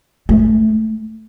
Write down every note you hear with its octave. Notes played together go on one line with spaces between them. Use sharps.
A3